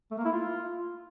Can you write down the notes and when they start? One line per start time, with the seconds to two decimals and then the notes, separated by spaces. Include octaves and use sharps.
0.11 A3
0.18 A#3
0.25 E4
0.32 F4